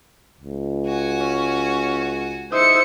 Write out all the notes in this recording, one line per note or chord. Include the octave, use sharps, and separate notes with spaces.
C#2
F#4 G#5
C#4
D#4 E4 C5 C#7